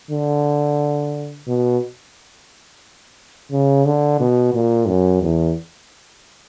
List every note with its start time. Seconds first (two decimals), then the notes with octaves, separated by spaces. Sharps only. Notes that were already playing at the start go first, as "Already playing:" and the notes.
0.11 D3
1.47 B2
3.51 C#3
3.86 D3
4.20 B2
4.54 A#2
4.88 F#2
5.22 E2